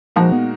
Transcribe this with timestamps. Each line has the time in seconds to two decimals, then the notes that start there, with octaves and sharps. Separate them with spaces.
0.16 A#2 F3 G#3 D#4 F#4 A#4
0.32 B3